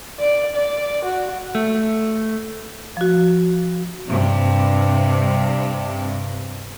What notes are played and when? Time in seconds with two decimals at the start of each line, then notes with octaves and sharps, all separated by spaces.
0.20 D5
0.55 D5
1.04 F#4
1.55 A3
2.97 F3 F#4
4.08 G2 C3